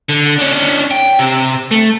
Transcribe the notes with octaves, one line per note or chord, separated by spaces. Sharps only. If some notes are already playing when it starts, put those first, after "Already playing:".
D3
C#4 D4
G5
C3
A3